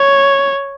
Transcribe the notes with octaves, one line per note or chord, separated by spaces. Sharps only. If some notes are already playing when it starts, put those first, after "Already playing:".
Already playing: C#5